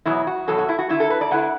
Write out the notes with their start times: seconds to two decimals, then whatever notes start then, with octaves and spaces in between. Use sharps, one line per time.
0.06 E2 B2 F#3 E4
0.27 F#4
0.48 E2 B2 F#3 A4
0.58 F#4
0.69 E4
0.79 F#4
0.89 D3 A3 E4
1.00 A4
1.10 B4
1.21 D5
1.31 D3 A3 E4 F#5